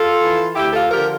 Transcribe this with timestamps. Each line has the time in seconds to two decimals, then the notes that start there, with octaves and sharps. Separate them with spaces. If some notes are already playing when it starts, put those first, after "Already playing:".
Already playing: F4 A4
0.20 E3
0.55 D2 E4 G4
0.73 F4 A4
0.91 D3 F3 G4 A#4